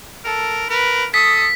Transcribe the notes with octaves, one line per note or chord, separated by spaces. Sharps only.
A4 A#4
A#4 B4
A4 D#6 B6